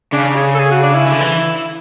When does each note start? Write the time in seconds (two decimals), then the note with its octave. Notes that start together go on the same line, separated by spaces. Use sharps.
0.13 C#3 D4
0.25 D4
0.36 G#4
0.55 A4
0.59 G#4
0.71 F#4
0.83 D4
0.95 E4
1.06 D3
1.20 E3